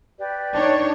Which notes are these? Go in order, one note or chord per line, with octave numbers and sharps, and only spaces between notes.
G4 B4 D5
D4 D#4 C#5